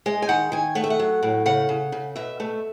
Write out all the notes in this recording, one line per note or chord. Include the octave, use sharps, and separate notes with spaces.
G#3 D#5
G#5
D#3 F#5
D#3 G#5
A3 F#5
E5
F#5
F#3
A2
C#3 F#5
C#3
C#3
B2 E5
A3